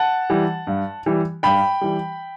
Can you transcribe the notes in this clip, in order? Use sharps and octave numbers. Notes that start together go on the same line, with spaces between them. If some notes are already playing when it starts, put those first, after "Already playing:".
Already playing: F#5 A5
E3 G3
G2
E3 G3
G2 G5 B5
E3 G3